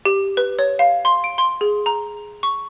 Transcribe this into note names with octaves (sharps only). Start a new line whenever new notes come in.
G4
B4
C#5
F5
C6
D7
C6
G#4
A#5
C#6